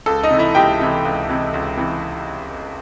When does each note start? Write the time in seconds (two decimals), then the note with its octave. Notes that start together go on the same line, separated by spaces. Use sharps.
0.06 C#2 A4
0.23 D#4 D#5
0.31 C3 E3
0.39 E4 E5
0.55 C#2 G4 G5
0.80 C3 E3
1.05 C#2
1.29 C3 E3
1.54 C#2
1.77 C3 E3